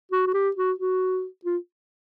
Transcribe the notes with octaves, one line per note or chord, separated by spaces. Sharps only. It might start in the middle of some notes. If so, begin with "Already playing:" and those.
F#4
F#4
G4
F#4
F#4
F4